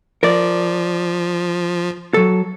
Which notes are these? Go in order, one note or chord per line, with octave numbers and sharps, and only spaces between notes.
F3 A#4 D5
F#3 A4